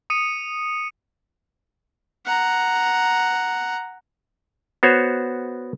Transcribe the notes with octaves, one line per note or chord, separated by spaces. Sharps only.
D#6 C#7 D#7
F#5 A#5
B3 F#4 C5 C#5